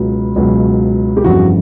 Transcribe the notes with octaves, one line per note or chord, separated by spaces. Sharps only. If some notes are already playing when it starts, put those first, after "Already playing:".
Already playing: C#2 B2 F#3
C#2 B2 F#3
G4
G1 F2 C#3 E3 F#4